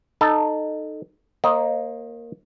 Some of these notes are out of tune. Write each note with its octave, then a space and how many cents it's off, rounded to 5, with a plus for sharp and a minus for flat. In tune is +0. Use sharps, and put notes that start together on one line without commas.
D#4 -15 A4 +0
A#3 +0 C5 +45 D#5 +0